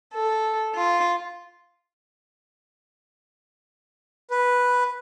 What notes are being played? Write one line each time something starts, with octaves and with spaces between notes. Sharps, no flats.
A4
F4
B4